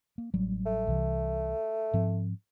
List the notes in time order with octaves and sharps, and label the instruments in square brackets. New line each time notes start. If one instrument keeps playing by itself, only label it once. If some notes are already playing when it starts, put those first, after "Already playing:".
[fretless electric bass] A#3
A1 F#3 G3
[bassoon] A3
[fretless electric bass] C2 C3 E3
G#2 F3 C4